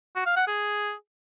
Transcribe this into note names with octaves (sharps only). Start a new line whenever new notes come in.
F#4
F5
F#5
G#4